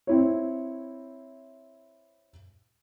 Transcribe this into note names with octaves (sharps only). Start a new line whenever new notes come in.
C4 E4 C#5